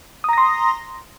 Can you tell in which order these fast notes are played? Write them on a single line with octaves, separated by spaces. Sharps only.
D#6 A#5 A#6 C6